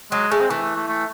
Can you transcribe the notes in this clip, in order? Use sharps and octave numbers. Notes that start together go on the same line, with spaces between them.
F#3 G#3
G#3 A3
C4
E3 A3
A3
A3
A3